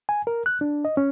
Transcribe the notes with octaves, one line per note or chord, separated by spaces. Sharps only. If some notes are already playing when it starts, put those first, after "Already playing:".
G#5
A#4
F#6
D4
D#5
C#4